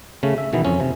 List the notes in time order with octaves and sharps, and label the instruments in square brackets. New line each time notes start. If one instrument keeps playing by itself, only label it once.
[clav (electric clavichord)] C#3 A3 C#4
E5
B2 D#3 E3 B3
F2 C#4
C3